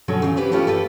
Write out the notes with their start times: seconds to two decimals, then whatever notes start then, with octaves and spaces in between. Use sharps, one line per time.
0.08 B2 D3 F#3 C#4
0.22 C#3 E3
0.36 E4 G4 B4 C5
0.52 E3 A3 C#4 E4 F4 G4
0.67 G4 A4 B4